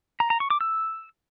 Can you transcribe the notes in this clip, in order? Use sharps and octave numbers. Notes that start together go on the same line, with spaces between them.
A#5
A#5
C#6
D6
E6